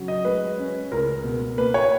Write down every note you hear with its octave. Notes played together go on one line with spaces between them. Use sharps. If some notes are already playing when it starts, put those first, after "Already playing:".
Already playing: C#3 F#3
D#5
G#3 B4
C#4
C#2 A#4
B2
A#3 B4
C#5